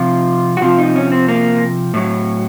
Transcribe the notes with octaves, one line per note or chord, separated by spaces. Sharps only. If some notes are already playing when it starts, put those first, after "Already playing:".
Already playing: C3 F3 F4
F#4
C3 F3 F4
D#4
C#4
C4
A#3
A2 F#3